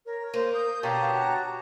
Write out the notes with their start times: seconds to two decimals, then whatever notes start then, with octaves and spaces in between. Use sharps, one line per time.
0.06 A#4 C#5
0.34 A#3 C5
0.54 D#6 G6
0.83 B2 D3 G4 C#5 F5 A5 A#5
1.11 F#4